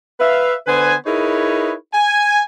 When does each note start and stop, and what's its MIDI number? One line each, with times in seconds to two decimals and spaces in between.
0.20 0.54 71
0.20 0.54 76
0.20 0.54 77
0.67 0.95 50
0.67 0.95 59
0.67 0.95 71
0.67 0.95 72
0.67 0.95 80
1.06 1.73 63
1.06 1.73 64
1.06 1.73 68
1.06 1.73 70
1.06 1.73 71
1.06 1.73 73
1.94 2.42 80